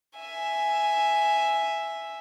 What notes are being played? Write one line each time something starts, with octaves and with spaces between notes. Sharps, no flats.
E5 G#5